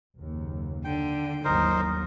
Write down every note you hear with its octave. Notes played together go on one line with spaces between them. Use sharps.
F#1 D#2
D3 G5
G1 D#2 F#3 D#4 A#4 C5